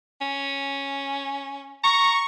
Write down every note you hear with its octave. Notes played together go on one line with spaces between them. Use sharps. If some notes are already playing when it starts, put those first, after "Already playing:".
C#4
A#5 C#6